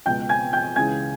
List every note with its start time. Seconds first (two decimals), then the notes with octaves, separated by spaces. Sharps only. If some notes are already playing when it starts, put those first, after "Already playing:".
0.06 C#2 B2 G5 G6
0.29 G#5 G#6
0.53 G5 G6
0.76 C#2 C#3 E3 G#5 G#6